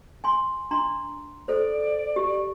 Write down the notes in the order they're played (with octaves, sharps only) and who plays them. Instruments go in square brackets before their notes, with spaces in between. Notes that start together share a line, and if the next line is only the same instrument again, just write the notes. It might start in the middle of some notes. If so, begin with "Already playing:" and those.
[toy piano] G#5 C6
D4 A#5 C6
[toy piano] A4 C5 [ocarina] D5
[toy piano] G4